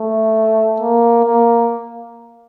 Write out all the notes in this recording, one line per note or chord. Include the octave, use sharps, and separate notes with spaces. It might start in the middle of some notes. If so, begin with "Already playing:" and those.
Already playing: A3
A#3
A#3